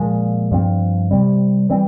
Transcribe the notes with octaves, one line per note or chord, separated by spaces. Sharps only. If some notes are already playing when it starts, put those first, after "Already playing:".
Already playing: A#2 F3 G#3
G2 F3 C4
C3 G3 C4
E3 G3 C4